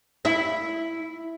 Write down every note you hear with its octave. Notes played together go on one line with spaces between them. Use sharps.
E4 E5